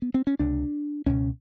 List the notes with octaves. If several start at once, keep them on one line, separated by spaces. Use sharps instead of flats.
B3
C4
C#4
C#2 C3 D4
C#2 B2 C#4